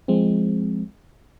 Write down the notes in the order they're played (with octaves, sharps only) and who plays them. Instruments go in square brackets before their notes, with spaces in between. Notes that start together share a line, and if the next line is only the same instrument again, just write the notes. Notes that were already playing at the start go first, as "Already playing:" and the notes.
[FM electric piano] F3 G#3 C4